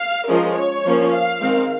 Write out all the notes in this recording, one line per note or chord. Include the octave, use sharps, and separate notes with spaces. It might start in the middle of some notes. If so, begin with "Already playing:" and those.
Already playing: F5
F3 G#3 C#4 A#4
C#5
F3 A#3 C#4
F5
D#3 G#3 C4